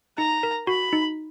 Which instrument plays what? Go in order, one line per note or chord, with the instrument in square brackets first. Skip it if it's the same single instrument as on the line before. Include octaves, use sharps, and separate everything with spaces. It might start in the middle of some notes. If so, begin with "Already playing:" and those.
[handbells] D#4 [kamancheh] A#5
[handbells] A#4
[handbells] F#4 [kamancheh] B5
[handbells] D#4